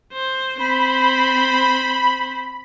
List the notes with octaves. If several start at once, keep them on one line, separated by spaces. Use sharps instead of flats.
C5
C4 C5 B5